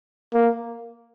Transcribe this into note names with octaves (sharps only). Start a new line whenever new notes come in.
A#3